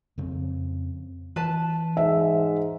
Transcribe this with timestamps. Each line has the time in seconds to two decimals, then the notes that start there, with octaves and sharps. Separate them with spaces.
0.18 F2 C#3 C4
1.36 E3 B4 A5
1.97 G#2 E5